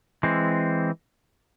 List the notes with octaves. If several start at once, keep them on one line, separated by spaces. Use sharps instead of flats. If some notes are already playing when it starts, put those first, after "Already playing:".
E3 G#3 C4